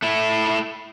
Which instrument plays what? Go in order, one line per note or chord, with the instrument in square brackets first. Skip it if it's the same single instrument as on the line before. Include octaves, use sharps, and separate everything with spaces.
[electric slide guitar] A3 E4